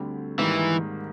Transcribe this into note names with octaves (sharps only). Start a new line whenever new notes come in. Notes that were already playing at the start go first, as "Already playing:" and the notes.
Already playing: D2 D3 G3 C4
G#2 D#3 E3 G3 A#3